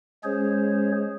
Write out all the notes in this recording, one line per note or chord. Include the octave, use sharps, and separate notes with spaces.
G#3 C#4 G#4 C5 C#5